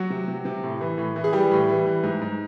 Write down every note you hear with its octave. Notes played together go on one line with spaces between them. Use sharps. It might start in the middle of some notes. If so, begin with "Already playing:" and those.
Already playing: F#3 F#4
C3
C3
C3
A2
E3
A2
E3
G#4
E3 G3 G4
A2
E3
E3
G#2
G#2